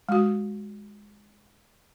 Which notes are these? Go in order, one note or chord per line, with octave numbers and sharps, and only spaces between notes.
G#3 F#4